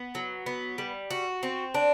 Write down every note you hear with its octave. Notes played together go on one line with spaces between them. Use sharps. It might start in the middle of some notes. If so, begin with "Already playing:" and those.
Already playing: B3
F#3
B3
G3
F#4
C4
D4